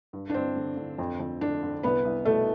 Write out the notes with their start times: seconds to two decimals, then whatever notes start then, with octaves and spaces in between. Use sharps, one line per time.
0.13 G2
0.30 D4
0.34 G2 C4
0.56 D3
0.77 D3
0.98 F2
1.20 F2
1.41 D3 D4
1.63 D3
1.83 C2 B3 B4
2.05 C2
2.25 B2 A3 A4